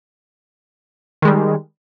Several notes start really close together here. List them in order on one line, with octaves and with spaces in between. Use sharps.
D#3 G#3 G3